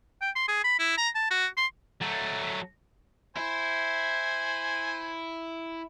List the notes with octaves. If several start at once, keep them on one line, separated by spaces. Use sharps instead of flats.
G5
C6
G#4
B5
E4
A#5
A5
F#4
C6
F#3 A3
E4 C5 G#5